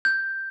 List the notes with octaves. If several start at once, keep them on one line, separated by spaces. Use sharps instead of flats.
G6